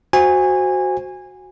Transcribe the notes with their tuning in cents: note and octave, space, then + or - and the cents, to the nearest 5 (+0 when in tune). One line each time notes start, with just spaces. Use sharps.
F#4 +0 C5 +0 G#5 -20